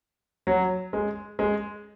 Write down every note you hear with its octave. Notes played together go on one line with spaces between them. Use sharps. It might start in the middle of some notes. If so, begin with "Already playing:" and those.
F#3
G#3
G#3